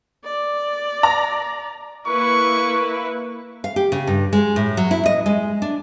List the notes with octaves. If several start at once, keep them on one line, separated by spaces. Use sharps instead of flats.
D5
A#5
A#3 E4 B4 C#6
F5
G4
C#3
G2
G#3
A2
F#3
E4
D#5
G#3
D4